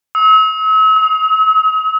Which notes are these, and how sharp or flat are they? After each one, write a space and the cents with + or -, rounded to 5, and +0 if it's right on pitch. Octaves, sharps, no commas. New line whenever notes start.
E6 -45
D#6 +40